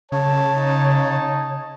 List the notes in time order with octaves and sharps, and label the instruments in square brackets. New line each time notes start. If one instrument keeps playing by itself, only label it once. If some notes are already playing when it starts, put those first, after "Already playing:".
[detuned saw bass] C#3 [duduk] C#5 [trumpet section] A5
[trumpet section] D#4 A5